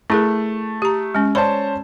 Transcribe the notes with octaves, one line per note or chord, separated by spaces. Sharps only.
A3 E4 G#4 A#4
G4 A#5
G#3 C#4
C#4 C5 D5 A5 B5